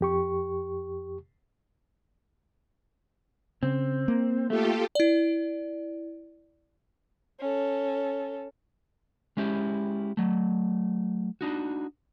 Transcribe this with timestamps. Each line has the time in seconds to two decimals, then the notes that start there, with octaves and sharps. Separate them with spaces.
0.01 F2 G4 C#6
3.63 C#3 C4
4.08 A#3
4.50 A3 F4 G4 A4
4.95 E4 D5
7.40 C#4 A4
9.37 G#3 C#4 E4 G4
10.17 F#3 A3
11.41 D4 D#4 F#4